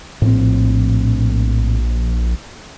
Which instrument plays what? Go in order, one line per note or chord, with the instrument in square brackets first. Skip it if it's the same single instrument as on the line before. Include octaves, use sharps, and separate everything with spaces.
[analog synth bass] A#1 [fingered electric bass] A2 C4